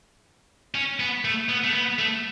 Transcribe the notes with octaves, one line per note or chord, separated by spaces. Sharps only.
C#4
B3
A3
B3
A3
B3
A3